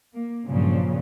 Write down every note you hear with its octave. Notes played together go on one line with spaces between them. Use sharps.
A#3
G2 A#2 C#3 F3 F#3